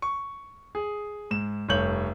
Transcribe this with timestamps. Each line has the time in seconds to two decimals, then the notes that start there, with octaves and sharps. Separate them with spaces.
0.02 C#6
0.75 G#4
1.31 G#2 E7
1.69 F1 G2 A4 C#5 G6 F#7